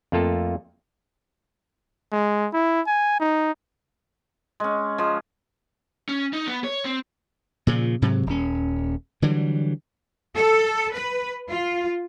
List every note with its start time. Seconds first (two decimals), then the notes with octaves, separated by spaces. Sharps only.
0.12 F2 A3 A#3 F4 A4
2.12 G#3
2.53 E4
2.87 G#5
3.20 D#4
4.60 G#3 C#4
4.98 F3 G#3
6.09 C#4
6.33 D#4
6.47 B3
6.64 C#5
6.85 C4
7.67 A#2 C#3 F3
8.02 G#2 C3 F#3
8.27 D#1 C#4
9.22 D3 E3 F#3 G3
10.35 A4
10.94 B4
11.51 F4